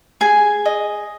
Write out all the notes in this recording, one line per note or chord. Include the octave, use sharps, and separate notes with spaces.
G#4 G#5
D#5